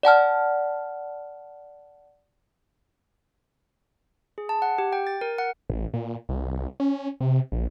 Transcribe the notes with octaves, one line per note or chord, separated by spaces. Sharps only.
D5 F#5 A5 F6
G#4
A5
F#5
G4
G5
A6
A#4
F#5
A1
A#2
C2
C#4
C3
A#1